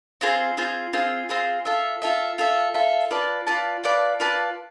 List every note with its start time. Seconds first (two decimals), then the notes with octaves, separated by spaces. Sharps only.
0.21 C4 F4 G#4 C5
0.57 C4 F4 G#4 C5
0.93 C4 F4 G#4 C5
1.29 C4 F4 G#4 C5
1.65 F4 A4 E5
2.02 F4 A4 E5
2.38 F4 A4 E5
2.74 F4 A4 E5
3.11 F4 B4 D5 A5
3.47 F4 B4 D5 A5
3.84 F4 B4 D5 A5
4.20 F4 B4 D5 A5